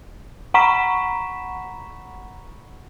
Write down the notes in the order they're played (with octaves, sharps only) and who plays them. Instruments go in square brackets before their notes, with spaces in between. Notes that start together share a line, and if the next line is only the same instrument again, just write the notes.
[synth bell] F#5 A#5 B5 C#6 B6 E7